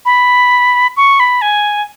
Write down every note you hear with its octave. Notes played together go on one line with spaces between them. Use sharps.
B5
C#6
B5
G#5